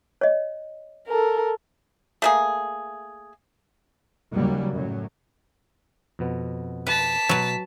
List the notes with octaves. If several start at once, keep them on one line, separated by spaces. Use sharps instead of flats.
C#5 D#5
A4 A#4
A3 A#3 G#4
D#2 C#3 F#3 G3 A#3
F#2 A2 F#3
F2 B2 B3
B4 A5 B6
B2 F#3 B4